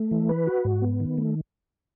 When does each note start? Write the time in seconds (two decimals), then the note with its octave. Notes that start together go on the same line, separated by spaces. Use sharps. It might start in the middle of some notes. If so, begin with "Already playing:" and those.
Already playing: A3
0.11 E3
0.29 B4
0.47 F#4
0.65 G#2
0.82 B3
1.00 D#3
1.18 A3